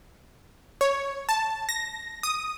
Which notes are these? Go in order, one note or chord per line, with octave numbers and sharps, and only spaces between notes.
C#5
A5
A#6
D#6